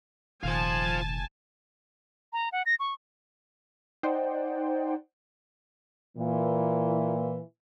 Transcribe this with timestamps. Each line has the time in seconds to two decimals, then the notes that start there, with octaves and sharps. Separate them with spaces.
0.43 F1 A#2 D#3 F4 C5 G#5 A5
2.33 A#5
2.52 F#5
2.66 A#6
2.80 C#6
4.03 D#4 C5 D5 F#5 G5
6.17 A#2 E3